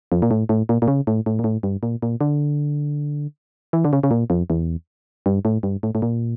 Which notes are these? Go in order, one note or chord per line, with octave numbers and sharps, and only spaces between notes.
F2
A#2
A2
A2
A#2
A#2
C#3
A2
A2
A#2
A2
G2
A#2
A#2
D3
E3
D3
C#3
C#3
A#2
F2
E2
G2
A2
G2
A2
A2
A#2